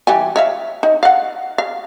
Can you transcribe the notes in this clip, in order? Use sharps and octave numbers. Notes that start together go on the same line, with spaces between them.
E3 G3 G#5
C#5 E5 F5
D#4
F5 F#5
F5